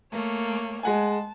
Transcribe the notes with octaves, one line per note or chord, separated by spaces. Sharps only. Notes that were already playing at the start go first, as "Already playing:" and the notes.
A3 A#3 C#5
G#3 F#5 G#5 A5